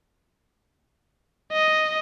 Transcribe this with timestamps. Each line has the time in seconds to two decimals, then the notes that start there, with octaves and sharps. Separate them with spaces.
1.53 D#5